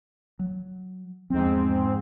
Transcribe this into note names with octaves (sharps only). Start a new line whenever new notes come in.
F#3
E2 G#2 F3 C4